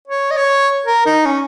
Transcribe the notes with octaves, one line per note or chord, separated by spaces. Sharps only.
C#5
D#5
C#5
A#4
D#4
C#4